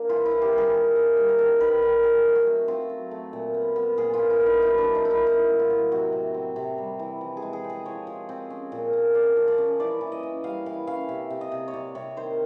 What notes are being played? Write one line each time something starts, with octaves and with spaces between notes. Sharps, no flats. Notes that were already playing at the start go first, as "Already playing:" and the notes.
Already playing: A#3 D4
E3 F4
E4
A#3
G4
G3
G#4
D#3
A#3
G3
A#4
D#3 A4
D#3 B4
D#3 A#4
F#3 G#4
A3
F#4
C4
C4 F4
F#3
A3
A#2
B3
B3
A#2 G#4
F4
A#2
E4
B3
D#4
F#3 E4
D4
A#3
D#4
A#3 E4
D#4
F#3 E4
A2
F4
F#3
C3 F#4
C3
C4
C3
G3
E3
F3
G#4
G#3
G#4
C4
G#4
F3 C#5
F3
C4
C#4
A#2
A#3
C#4 D5
F3
D5
C#4
E3 D5
E3
D#5
C#4
G3 F5
E3 F5
C#4 F5
C3 E5
C3
D#5
C3
C#5
C3 D5
C3 C#5
D#3 C5